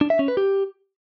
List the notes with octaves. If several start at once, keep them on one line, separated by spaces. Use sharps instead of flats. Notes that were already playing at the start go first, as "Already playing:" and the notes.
D4
E5
C#4
B4
G4